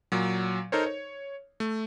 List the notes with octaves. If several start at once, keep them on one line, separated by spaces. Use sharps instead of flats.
A#2 F#3
D#4 A4 A#4 C5 C#5
C#5
A3